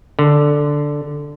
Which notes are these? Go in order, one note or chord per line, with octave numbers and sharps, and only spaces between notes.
D3